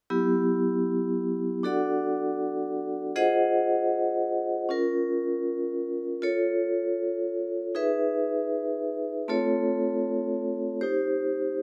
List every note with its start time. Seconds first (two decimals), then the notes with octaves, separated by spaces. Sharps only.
0.10 F#3 B3 E4 G4
1.63 D4 F#4 A4 D5 F#5
3.16 F4 G#4 C5 D#5 F#5
4.69 C#4 F4 A#4
6.22 F4 A4 C#5
7.75 D#4 G#4 B4 E5
9.28 A3 C4 F4 A4 C#5
10.81 D#4 G4 C5